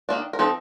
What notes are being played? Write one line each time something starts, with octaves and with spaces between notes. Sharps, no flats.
D#3 A#3 D4
A#4
F3 C4 D#4 A4